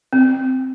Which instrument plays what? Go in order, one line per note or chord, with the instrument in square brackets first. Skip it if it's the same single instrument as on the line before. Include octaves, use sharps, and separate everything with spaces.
[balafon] C4